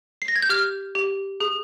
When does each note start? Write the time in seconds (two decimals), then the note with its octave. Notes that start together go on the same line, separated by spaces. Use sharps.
0.22 C7
0.28 A#6
0.36 G#6
0.42 G6
0.49 G4 F6
0.95 G4
1.40 G#4